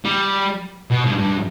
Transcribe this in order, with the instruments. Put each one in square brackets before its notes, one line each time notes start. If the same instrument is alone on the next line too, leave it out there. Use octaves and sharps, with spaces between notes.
[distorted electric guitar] G3
B2
G2
G2